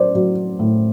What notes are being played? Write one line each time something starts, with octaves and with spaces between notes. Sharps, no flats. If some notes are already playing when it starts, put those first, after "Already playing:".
Already playing: A2 F#3 C5 D5
F#3
A2